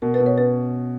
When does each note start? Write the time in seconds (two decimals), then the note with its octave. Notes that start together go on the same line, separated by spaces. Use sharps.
0.02 B2 A#4
0.14 B4
0.20 B2
0.26 C#5
0.38 C#4 B4